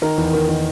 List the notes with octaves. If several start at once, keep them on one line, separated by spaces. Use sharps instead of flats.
D#3 A#4
E2
D#3
D#3